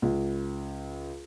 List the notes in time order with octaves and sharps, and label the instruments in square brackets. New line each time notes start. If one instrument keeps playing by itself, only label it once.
[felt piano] C#2